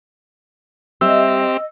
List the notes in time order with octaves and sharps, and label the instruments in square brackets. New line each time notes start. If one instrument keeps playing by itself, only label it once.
[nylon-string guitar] G3 E5 [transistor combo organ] C4 G4 [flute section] D#5 [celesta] E6